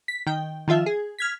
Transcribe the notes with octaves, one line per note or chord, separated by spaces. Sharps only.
B6
D#3 G5
D#3 F3 F4 E5
G#4
F6 G#6 B6